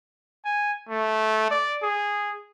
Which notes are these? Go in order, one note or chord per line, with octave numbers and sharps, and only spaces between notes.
G#5
A3
D5
G#4